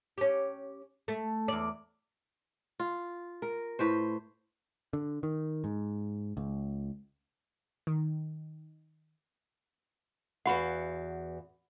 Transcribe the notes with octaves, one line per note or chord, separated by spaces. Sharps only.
C#4 G4
A3
E2 D5
F4
A#4
A2 B4 C5
D3
D#3
G#2
C#2
D#3
E2 F#4 F5 F#5 B5